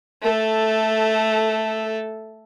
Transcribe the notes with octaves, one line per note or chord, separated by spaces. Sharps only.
A3 A4